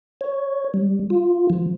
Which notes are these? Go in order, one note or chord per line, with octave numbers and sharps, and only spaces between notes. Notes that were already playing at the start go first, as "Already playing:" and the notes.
C#5
G3
F4
F3